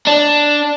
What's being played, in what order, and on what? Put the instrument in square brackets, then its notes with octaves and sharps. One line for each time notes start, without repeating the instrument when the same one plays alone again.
[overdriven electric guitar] D4